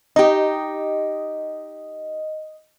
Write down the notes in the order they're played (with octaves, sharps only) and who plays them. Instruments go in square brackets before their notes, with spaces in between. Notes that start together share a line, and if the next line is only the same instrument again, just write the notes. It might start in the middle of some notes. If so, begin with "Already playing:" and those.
[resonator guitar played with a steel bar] D#4 G4 [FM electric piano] D#5